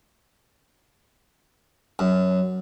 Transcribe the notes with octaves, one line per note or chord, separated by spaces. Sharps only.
F#2